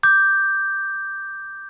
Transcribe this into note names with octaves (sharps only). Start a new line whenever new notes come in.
D6 G6